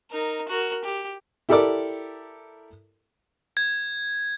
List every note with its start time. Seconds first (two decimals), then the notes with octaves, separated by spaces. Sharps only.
0.11 D#4 A#4
0.48 F#4 A#4
0.84 G4
1.49 E4 G4 A4 A#4 D5 D6
3.57 G#6